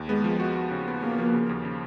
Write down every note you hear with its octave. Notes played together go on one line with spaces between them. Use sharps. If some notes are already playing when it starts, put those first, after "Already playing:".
Already playing: D#2
G#3 B3
F3
F#4
F#4
C#3
B3
C#3 A#3
F3
C#3
D#2
C#3